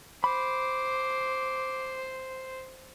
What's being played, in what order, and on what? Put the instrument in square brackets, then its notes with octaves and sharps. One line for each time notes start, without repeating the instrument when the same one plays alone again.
[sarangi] C5 [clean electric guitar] B5 [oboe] D6